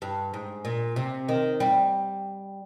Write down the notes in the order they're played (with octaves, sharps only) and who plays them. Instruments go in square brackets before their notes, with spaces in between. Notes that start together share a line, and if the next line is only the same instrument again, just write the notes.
[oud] G2
G#2
A#2
C3
D#3
G3